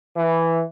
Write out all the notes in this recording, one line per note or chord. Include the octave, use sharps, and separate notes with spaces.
E3